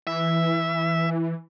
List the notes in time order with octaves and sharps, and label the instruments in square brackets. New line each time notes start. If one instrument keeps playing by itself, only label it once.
[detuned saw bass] E3 [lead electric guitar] E5